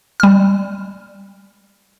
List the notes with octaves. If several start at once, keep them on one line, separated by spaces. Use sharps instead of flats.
G3 F6